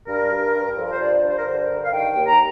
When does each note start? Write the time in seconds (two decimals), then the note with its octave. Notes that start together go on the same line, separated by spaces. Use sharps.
0.07 G2 A#4
0.30 G2
0.53 G2
0.76 F3 A4
0.84 A#4
0.92 C5
0.99 G2 D5
1.23 G2
1.30 C5
1.38 A#4
1.45 D3 C5
1.61 A#4
1.69 G2
1.84 F5
1.91 D#3 G5
2.15 D#2
2.27 A#5